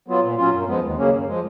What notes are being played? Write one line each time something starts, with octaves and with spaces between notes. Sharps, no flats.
F#3 B3 F4
A#2
F#3 C#4 F4
F#2
F3 G#3 B3
D#2
C#3 F#3 A#3 C#4
F#2
F3 G#3